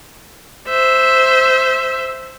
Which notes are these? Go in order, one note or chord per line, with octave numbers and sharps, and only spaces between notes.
C5 E5